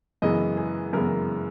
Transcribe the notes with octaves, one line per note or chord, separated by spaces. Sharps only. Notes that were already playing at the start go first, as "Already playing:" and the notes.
F#2 C#3 E3 G#3 B3 D#5
G#4
F#2 C#3 E3 G#3 B3 A#4